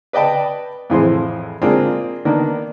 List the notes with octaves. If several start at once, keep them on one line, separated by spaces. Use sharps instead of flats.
B4 D5 D#5 G5 A5 B5
F2 A2 E3 G#4 C5 C6
G#3 A#3 C4 D4 F4 G#4
D#3 A#3 B3 D4